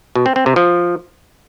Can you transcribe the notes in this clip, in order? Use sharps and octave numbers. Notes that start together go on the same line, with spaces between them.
B2
C4
C4
C3
F3